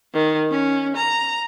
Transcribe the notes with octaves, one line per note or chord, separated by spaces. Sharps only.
D#3
C#4
A#5